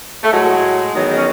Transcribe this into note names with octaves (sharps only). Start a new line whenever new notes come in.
A3
A2 F#3 G#3
E2 D#3 F#3
C#4